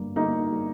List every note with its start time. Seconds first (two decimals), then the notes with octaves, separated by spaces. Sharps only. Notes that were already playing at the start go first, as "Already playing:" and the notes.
Already playing: G1 G2 G3 A#3
0.16 G1 A#3 D#4
0.52 G3